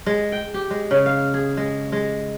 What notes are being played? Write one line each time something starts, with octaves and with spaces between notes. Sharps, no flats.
G#3
G5
G4
G#3
C#3
F5
G#4
G#3
G#3